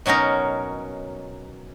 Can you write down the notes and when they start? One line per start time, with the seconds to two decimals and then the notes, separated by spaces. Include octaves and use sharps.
0.06 B2 F#3 C#4 D#4 A#4